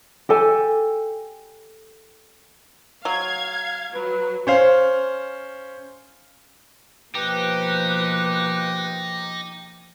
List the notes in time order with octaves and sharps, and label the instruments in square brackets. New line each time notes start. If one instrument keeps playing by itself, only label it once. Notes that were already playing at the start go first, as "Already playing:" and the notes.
[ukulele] G4 A4 G#5
[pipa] F#3 [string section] F5 G#6
[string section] F#3 [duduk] B4
[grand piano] C#4 C5 F5
[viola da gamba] B2 F3 A#3 [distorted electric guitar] D#4 [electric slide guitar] G4 [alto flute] B4